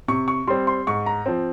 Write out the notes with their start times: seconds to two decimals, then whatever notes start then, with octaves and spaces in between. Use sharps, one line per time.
0.08 C3 C#6
0.28 C#6
0.47 G3 C4 C6
0.67 C6
0.87 G#2 C#6
1.06 A#5
1.26 F3 C4